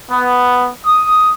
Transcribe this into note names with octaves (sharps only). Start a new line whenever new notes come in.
B3
D#6